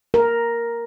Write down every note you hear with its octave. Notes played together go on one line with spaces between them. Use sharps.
A#4